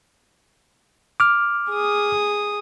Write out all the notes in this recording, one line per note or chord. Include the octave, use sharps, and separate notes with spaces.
D6 F6
G#4 D#6